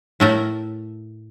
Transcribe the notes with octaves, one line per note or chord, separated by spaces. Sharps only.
A2 A3 A#4